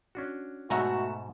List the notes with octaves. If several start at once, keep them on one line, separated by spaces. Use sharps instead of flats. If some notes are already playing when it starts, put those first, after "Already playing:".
C#4 D4 F#4
G#2 B2 A3 F#4 E5 A#5